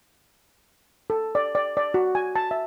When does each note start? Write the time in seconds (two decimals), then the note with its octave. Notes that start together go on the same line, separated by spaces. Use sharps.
1.10 A4
1.35 D5
1.55 D5
1.77 D5
1.94 F#4
2.15 G#5
2.36 A5
2.51 E5